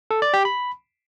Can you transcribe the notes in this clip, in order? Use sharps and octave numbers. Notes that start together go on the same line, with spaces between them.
A4
D5
G4
B5